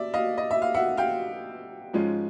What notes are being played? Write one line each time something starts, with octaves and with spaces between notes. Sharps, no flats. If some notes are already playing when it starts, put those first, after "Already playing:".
Already playing: D5 E5
D#5 F5
D#5
E5
F5
E5 F#5
F5 G5
G#2 F3 G#3 C#4 F4